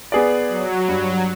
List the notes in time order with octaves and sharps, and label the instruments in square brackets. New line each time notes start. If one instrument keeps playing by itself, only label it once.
[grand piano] B3 G#4 D5
[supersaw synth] F#3
[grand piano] G2